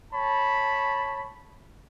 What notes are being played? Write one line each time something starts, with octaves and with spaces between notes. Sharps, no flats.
C#5 A5 B5